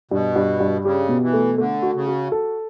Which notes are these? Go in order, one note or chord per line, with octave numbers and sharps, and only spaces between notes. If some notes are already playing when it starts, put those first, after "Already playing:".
G2 B2
G2
G2
C#3 G4
B2
E3
A3
D3 A3
F#4
C#3
F#4
A4